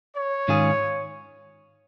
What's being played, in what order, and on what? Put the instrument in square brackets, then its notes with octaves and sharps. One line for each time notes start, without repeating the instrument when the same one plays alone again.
[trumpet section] C#5
[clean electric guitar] G#2 D#3 C#4 F4 G#4